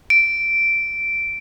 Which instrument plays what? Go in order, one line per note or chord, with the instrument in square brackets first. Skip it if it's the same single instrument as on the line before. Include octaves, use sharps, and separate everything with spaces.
[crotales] D7